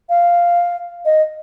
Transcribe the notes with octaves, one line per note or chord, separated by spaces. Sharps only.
F5
D#5